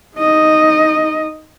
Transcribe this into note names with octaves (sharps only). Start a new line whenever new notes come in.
D#4 D#5